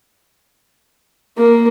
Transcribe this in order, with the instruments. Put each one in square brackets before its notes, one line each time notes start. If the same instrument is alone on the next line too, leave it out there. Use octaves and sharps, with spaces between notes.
[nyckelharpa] A#3